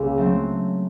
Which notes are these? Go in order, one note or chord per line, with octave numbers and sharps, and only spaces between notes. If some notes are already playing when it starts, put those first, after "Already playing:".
Already playing: C#2 A#3 C#4
F#3 A3 C4